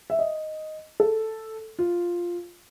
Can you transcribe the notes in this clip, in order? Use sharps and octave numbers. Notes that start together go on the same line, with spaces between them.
E5
D#5
A4
F4